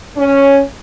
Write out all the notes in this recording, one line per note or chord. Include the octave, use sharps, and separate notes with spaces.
C#4